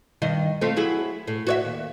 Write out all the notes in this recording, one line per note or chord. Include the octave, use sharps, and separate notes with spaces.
G2 D#3 D#5
A3 C4 F4
F#3 E4 G#4
A2
F#4 C#5 E5
D#2